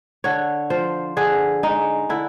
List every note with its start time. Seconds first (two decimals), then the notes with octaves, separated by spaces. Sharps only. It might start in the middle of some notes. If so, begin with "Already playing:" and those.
0.24 D3 C#5
0.70 F3 C5
1.17 D3 G#4
1.63 G#3 D#4
2.09 D3 E4